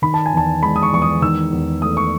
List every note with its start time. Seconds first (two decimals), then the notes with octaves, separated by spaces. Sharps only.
0.02 D#3 B5
0.14 A5
0.26 G#5
0.33 E2 A5
0.62 G#3 B5
0.76 D#6
0.83 C#6
0.93 E2 C#6
1.02 D#6
1.22 D#3 E6
1.53 E2
1.82 A3 D#6
1.97 C#6